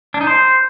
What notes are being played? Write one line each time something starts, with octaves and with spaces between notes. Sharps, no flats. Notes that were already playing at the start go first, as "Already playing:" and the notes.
D4
D#4
C5